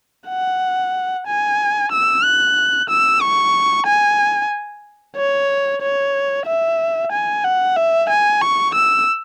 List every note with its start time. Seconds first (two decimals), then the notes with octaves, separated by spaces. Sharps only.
0.29 F#5
1.27 G#5
1.92 E6
2.24 F#6
2.89 E6
3.21 C#6
3.86 G#5
5.16 C#5
5.81 C#5
6.46 E5
7.12 G#5
7.44 F#5
7.76 E5
8.09 G#5
8.42 C#6
8.74 E6